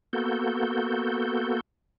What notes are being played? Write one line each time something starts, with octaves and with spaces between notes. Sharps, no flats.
A#3 B3 F#4 A4 G6